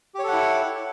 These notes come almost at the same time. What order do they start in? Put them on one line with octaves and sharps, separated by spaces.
G4 C#5 A4 F#5 E4